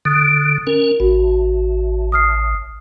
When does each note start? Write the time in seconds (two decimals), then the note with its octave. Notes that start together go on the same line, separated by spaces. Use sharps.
0.05 D3 D#6
0.67 C#4 A#4
1.00 A1 F#4
2.12 D#6 F6 C7